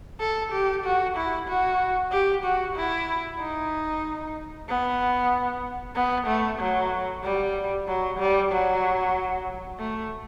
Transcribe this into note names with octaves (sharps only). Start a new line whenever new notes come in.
A4
G4
F#4
E4
F#4
G4
F#4
E4
D#4
B3
B3
A3
F#3
G3
F#3
G3
F#3
A3